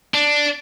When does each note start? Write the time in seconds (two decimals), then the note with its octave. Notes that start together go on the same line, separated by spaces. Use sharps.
0.14 D4